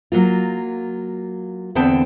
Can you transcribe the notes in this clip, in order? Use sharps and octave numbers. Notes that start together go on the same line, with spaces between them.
F#3 A#3 F4
E2 D3 B3 C4 G5 A5